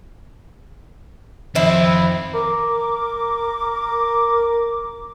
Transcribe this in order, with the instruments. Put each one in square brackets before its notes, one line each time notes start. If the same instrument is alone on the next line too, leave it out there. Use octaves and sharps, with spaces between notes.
[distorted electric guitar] F2 [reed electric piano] D#3 [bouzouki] C4 E4
[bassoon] A#4 [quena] D6